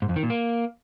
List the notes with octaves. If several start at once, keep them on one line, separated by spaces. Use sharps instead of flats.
G#2
F2
D#3
A#2
A#3